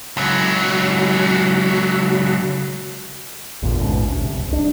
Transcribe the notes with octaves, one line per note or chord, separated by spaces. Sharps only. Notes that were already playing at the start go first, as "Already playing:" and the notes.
C#2 F#3
A1 E2 A#2 D3
A1 G#2 B2 C#4
D2
F1 C2
C2 D4